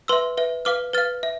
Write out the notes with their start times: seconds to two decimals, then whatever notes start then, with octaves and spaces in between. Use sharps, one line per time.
0.08 B4 E5 C6 E6
0.37 B4 E5
0.65 B4 F5 D6 F6
0.93 B4 F5 F6 A6
1.23 E5